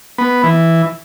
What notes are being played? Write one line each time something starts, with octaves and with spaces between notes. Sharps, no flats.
B3
E3